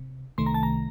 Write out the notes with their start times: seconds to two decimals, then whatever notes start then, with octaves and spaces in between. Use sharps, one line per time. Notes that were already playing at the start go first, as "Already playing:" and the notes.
Already playing: C3
0.38 C2 C3 D#3 A3 C6
0.46 A#5
0.54 A5
0.63 A#5